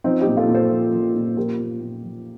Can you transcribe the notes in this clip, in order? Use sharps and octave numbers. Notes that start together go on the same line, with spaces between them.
F3 C4 D#4
D#4 G4
A#2
F4 A4
A#2
A4 C5
F3
F3
A#2
F3 G4 A#4
A#2
A#2
F3